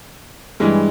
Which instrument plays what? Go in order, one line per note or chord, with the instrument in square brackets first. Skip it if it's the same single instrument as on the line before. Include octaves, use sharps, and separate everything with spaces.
[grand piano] G2 E3 G#3